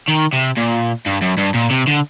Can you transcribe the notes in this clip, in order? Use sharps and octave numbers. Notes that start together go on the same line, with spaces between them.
D#3
C3
A#2
G2
F#2
G2
A#2
C3
D3